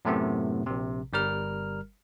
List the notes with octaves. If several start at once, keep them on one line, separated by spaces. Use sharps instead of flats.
F#2 A2 C3 A3 B3
A#1 C3
G1 G3 A#4 F6